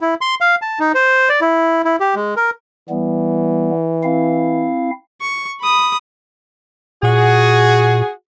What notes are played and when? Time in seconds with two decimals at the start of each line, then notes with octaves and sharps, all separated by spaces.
0.01 E4
0.21 C6
0.41 F5
0.62 A5
0.80 D#4
0.95 C5
1.29 D5
1.41 E4
1.85 E4
2.00 G4
2.15 G#3
2.36 A#4
2.90 E3 G3 B3
4.03 C4 E4 F5
5.21 C#6
5.61 B5 D#6
7.03 A#2 F#4 G#4